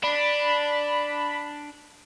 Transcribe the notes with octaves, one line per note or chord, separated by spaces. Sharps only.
D4 B5